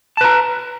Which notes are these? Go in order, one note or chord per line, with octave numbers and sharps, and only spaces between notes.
B4 A5 A#5